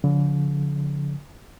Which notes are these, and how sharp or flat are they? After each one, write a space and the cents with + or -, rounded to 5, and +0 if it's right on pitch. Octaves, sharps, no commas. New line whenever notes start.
D3 -45 F3 +15